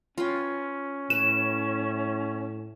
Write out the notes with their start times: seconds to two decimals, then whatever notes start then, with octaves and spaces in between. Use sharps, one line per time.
0.18 C#4 F4 B4 G5
1.10 A2 B4 E7